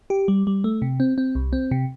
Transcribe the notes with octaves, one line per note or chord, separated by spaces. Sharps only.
G4
G3
G3
A3
C3
C4
C4
C2
C4
C3